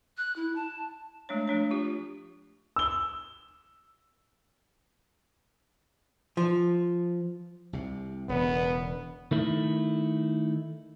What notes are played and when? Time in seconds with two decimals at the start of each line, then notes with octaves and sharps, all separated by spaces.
0.17 F#6
0.36 E4
0.55 A5
1.29 G#3 A3 D4 C#5
1.48 F3 A3 D4 C#5
1.71 F4 G4
2.76 E6 G7
6.37 F3
7.73 C2 C3
8.29 E1 C#3 B3
9.31 D#3 A3 E4